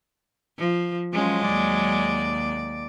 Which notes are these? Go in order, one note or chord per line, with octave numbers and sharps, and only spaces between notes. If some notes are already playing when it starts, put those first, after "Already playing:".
F3
F3 F#3 G#3 C#4
D#2 D5